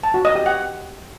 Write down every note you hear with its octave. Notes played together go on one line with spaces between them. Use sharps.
A5
F#4
D#5
G4
F#5